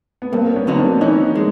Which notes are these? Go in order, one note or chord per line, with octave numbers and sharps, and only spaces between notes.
B3
G2 A#3 C4
C4
B3 C#4
D3 F#3 A#3 D#4
C4 D4
E3 C#4 D#4
G#3